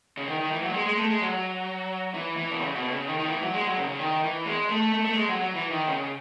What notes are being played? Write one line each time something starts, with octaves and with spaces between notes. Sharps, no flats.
C#3
D#3
D#3
E3
F#3
A3
G#3
G#3
A3
G#3
F#3
E3
E3
B2
C#3
B2
C#3
D#3
D#3
E3
F#3
G#3
F#3
C#3
C#3
D#3
E3
G#3
A3
A3
A3
G#3
F#3
F#3
E3
D#3
C#3